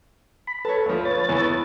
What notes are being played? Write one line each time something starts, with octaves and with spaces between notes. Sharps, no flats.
B5
A4 B4 C#5 A5
D2 F3
B4 C#5 A6
E2 E3